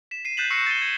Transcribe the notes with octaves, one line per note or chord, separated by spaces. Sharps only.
B6 E7
C7 D#7
F#6 G6 A6 B6 E7 F#7
C#6 E6 A#6 C7 C#7
A6 D#7 G7
G#6